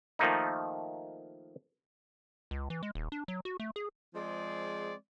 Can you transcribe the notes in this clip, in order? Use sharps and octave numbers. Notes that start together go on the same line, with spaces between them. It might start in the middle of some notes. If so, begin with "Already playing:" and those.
D#3 F3 A3 A#3 D#4
C#2
E3
G#3
D#1
D4
F#3
F#4
A3
G#4
F3 G#3 C4 G#4 D5